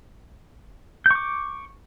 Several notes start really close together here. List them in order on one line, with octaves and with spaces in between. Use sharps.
G6 C#6 D6